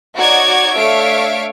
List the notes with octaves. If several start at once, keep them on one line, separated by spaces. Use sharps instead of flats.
D#4 F#4 C#5 D5 D6 G#6
A3 D4 C#5 E5 F5 D7